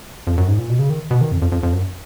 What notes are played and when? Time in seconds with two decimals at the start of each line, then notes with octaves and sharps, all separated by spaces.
0.27 F2
0.38 F#2
0.48 G#2
0.58 A#2
0.69 B2
0.79 C#3
0.90 D#3
1.11 B2
1.21 D#3
1.32 F2
1.42 F2
1.52 F2
1.63 F2
1.73 F#2